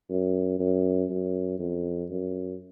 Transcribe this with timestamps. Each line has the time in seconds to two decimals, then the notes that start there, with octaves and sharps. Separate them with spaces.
0.10 F#2
0.60 F#2
1.10 F#2
1.60 F2
2.10 F#2